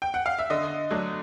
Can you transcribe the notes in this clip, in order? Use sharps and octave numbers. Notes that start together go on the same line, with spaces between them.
G5
F#5
F5
E5
D3 D#5
F#3 A3 D4